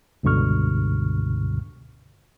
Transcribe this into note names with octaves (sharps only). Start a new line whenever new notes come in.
C#2 G2 B2 D3 C#6 F6